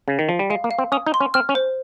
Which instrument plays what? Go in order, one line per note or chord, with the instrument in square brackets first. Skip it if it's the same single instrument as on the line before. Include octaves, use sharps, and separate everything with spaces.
[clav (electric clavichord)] C#3
D#3
F3
G3
[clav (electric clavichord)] G#3 [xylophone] F5
[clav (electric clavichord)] A#3
[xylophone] F5
[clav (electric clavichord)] C4
[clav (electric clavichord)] C#4 [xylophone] D#6
[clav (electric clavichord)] D#4
[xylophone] C6
[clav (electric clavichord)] C#4
[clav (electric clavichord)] C4 [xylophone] F6
[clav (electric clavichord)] C#4
[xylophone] C5